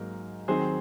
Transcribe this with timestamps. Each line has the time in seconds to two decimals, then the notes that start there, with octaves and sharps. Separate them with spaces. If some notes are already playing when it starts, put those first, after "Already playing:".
Already playing: G#2 F#3 A#3 A#4
0.48 D#3 F#3 C4 D#4 G#4 C5